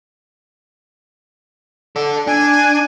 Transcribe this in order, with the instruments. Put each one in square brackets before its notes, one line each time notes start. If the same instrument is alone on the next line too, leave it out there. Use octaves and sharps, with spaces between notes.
[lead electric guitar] A4 D5
[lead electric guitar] D4 [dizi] G#5